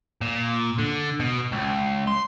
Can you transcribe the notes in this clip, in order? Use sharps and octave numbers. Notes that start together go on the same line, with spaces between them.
A#2
D3
B2
C#2
C6